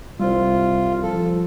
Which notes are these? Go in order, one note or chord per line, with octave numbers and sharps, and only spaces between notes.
C2 G3 F4 C5
F3 A4